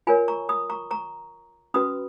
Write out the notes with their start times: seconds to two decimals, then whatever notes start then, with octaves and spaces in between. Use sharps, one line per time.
0.07 F4 A#4 C#5 G#5 B5
0.28 A#5 C#6
0.49 B5 D#6
0.70 A#5 C#6
0.91 A#5 C#6
1.74 C#4 F#4 B4 B5 D#6